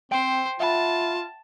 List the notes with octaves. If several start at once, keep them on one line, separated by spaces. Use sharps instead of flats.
C4 C5 G5
F4 E5 F#5 A5 B5